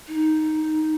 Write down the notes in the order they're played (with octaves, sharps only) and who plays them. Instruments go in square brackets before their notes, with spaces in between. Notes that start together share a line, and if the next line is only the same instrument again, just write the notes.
[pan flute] D#4